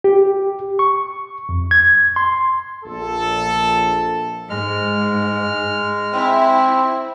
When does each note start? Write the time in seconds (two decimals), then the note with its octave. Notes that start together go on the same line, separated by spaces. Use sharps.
0.04 G4
0.79 C#6
1.49 F2
1.71 G#6
2.16 C6
2.85 A#1 A4
4.50 G#2 G#3 F6
6.14 C4 E4